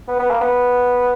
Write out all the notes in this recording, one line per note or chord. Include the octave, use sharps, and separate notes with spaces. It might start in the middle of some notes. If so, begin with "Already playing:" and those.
B3
B3
A#3
B3